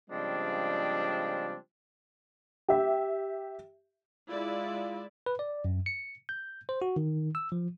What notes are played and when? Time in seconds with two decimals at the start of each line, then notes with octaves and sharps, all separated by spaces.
0.10 C#3 F3 G3 G#3 C4 D4
2.69 G4 E5
4.30 G#3 E4 F4 D5
5.26 B4
5.39 D5
5.65 F#2
5.86 C#7
6.29 G6
6.69 C5
6.82 F#4
6.96 D#3
7.35 E6
7.52 F3